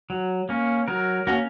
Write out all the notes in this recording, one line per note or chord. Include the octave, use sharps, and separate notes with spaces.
F#3
A#3 C#4
F#3 A#4
A#3 C#4 F#4